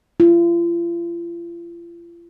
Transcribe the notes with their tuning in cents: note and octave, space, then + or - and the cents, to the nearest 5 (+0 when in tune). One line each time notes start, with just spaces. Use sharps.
F4 -40